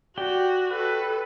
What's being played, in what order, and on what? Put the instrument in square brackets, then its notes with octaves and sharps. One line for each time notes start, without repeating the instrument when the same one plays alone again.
[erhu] F#4 [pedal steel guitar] G4 D5 G5
[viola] A4 B4